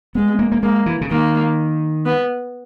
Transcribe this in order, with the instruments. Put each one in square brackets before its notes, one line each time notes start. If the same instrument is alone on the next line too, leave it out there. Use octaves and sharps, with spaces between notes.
[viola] G#3 [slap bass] B3
[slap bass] A#3
A#3
[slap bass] G#3 [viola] A#3
[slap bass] E3
C#3
[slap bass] D#3 [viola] A#3
[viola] B3